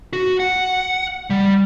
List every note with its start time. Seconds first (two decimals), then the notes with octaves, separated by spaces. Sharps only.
0.13 F#4
0.40 F#5
1.30 G3